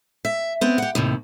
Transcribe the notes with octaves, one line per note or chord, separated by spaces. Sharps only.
E5
B3 C4
G4 F#5
D#2 A2 C3